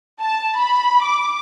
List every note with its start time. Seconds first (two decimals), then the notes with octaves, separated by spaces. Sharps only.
0.20 A5
0.59 B5
1.03 D6